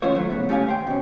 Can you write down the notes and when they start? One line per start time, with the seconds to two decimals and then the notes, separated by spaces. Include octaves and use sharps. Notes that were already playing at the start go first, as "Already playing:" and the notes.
0.02 D#3 A3 C#4 F4 C5 C#5
0.15 F#3 A3
0.30 A2 C#3 B3
0.49 A3 C#4 G4 C#5 F5 G#5
0.67 D#2 C5 G5
0.87 B2 C#4